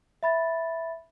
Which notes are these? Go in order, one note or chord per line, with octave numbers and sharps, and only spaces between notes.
E5 B5 A6